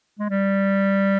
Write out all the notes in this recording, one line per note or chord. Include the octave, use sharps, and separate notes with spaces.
G#3
G3